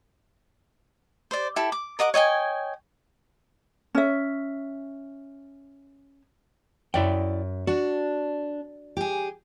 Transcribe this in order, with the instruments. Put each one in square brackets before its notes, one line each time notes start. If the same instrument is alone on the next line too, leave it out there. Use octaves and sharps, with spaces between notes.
[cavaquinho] C5 D5
E4 G4 A4
D6
A#4 D#5 F#5 D6
C#5 D#5 G5 G#5
[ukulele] C#4 E5
[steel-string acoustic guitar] F#2 [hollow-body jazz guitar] E4 D5 G5
[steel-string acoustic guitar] D4 [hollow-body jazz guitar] F#4
[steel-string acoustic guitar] G4 G#4